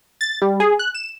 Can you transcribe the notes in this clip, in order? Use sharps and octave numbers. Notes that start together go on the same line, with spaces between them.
A6
G3
G#4
F#6
E7